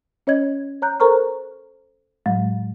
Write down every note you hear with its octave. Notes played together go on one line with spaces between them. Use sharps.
C#4 C#5 D#5 G#6
C#5 A#5 F#6 G6
A4 A#4 C5 A#5 C#6 F6
A2 F#3 G#3